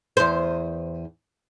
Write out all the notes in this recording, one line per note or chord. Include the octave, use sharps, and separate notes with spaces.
E2 C5